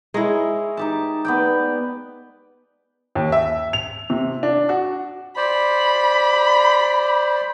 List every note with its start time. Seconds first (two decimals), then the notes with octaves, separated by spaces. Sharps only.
0.14 G#3 E4 G#4 C#5 A#5
0.77 D#4 G4 A5
1.25 B3 D5 G5
3.15 D#2
3.32 E5
3.73 F7
4.10 C3
4.43 D4
4.69 F#4
5.37 C5 D5 B5